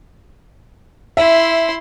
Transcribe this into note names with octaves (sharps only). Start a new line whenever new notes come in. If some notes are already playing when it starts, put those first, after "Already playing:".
E4 E5 C6